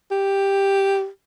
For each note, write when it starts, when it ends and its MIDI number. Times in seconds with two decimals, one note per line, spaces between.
0.11 1.08 67